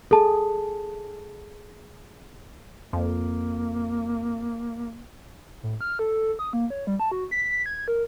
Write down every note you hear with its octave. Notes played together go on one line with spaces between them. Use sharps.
G#4 A4 A5
F2 A#3
A2
F6
A4
D#6
A#3
C#5
G3
A5
F#4
B6
G#6
A#4